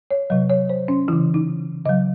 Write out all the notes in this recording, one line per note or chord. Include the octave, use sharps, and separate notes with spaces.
C#5
C3 F#3 D#5
C#5
C5
C#4
C#3 E3 E4
D#4
C#3 F#3 D#5